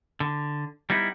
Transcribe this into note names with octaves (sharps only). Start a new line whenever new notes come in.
D3
G3 B3 D#4 E4